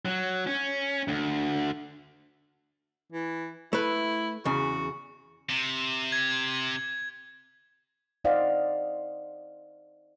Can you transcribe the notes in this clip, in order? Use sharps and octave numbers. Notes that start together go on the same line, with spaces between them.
F#3
C#4
D2
E3
A3 E4 B4
E2 C#3 F#4
C3
G#6
D#4 C5 D5 D#5 F5 F#5